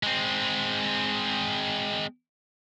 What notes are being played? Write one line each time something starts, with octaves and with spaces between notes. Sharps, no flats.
G#3 C4